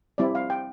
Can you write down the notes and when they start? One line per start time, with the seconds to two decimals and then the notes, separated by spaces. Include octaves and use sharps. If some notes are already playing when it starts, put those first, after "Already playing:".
0.18 G3 C4 E4 D5
0.35 F5
0.50 G5